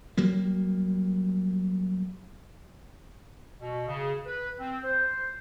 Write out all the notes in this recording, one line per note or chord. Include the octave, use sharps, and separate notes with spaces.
F#3 G3 A#3
B2
C#3
B4
C4
C5